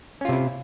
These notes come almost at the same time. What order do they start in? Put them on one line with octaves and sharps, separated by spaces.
C#4 F4 C3 E4